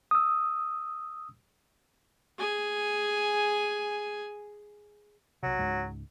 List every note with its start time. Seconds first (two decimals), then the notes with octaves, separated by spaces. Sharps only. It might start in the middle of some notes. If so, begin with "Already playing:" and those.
0.11 D#6 E6
2.37 G#4 G#5
5.43 B1 C3 F#3
5.59 C#2 G#2 G#3